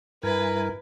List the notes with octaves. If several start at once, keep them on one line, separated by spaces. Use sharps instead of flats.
G2 E4 A#4 B4 G#5